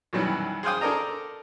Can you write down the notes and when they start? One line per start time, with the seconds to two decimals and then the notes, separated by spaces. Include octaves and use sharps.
0.13 F#2 B2 D#3 E3 F#3 G3
0.63 G#4 C5 F5 G5 D#6
0.81 D4 A4 A#4 D5 D#5 A#5